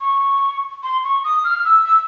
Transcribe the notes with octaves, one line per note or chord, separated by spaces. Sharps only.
C#6
C6
C#6
D#6
F6
E6
E6